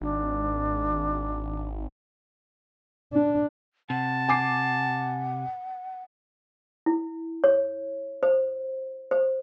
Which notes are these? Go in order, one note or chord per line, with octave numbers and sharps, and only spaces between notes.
G#1 D4
D4
C3 F#5 A5
G#5 D6 C7
E4
C#5
C5
C5